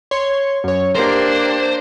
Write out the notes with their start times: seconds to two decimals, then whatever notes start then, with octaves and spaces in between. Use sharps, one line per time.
0.11 C#5 C6
0.64 F#2 C#5
0.95 A#3 D4 G4 A#4 C5